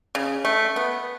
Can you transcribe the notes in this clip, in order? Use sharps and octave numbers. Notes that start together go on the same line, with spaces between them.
C#3
A3
B3